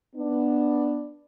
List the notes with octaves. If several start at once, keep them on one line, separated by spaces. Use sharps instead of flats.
B3 D4